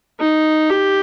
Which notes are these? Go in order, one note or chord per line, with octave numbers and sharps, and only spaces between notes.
D#4
G4